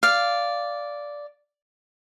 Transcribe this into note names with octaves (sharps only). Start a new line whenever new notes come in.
D5 F5